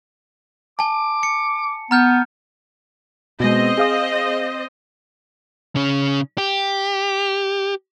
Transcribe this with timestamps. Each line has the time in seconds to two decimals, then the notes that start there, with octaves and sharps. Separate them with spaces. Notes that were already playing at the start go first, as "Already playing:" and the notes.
0.79 G#5 A5 D6
1.23 C#7
1.91 B3 A#5 F6 G6
3.40 B2 G#3 C4 C5 D#5
3.78 G#4 F5 D#6
5.76 C#3 C#4
6.38 G4